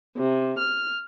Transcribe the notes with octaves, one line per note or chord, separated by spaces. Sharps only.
C3
F6